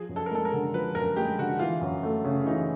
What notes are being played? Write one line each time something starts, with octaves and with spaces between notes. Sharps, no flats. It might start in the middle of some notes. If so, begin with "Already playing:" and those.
Already playing: F3 G#4
F#2
A4
A#4
G#3 A4
A#4
D3
F3 B4
F#2 A#4
G#3 G4
D3 F#4
E3 F4
F#2
A3
C#3
E3 D#4